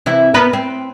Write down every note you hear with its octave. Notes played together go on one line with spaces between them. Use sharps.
C3 E3 E4
B3 A#4 B4
C4